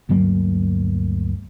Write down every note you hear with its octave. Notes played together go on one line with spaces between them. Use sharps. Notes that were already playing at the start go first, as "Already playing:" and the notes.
D2 G2 F#3 A#3